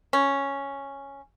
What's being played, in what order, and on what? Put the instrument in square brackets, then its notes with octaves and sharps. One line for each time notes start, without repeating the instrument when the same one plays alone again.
[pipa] C#4